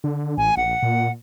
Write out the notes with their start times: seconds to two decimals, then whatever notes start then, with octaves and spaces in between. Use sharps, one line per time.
0.04 D3
0.38 A1 G#5
0.57 A#1 F#5
0.82 A#2